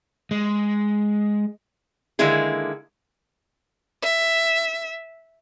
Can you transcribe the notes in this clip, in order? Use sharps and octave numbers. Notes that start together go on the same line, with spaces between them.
G#3
D3 D#3 G#3 A#3 E4 G#4
E5